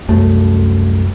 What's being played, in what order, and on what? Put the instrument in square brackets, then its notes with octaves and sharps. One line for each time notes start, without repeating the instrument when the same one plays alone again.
[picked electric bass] C2 F#2 A3